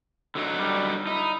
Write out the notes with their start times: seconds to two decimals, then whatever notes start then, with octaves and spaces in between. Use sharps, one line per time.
0.35 D3 F#3 D#4
0.59 G3
1.07 D#4 E4